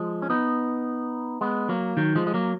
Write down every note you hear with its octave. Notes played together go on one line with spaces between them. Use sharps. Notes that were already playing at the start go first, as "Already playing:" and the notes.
Already playing: F3 G#3
C#4
B3 D#4
G#3 B3
F#3 A#3
D#3 F#3
F3 G#3
G#3
F#3 A#3